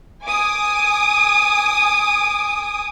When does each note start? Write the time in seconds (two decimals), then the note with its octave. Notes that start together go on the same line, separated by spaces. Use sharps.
0.24 G#5 D6 D#6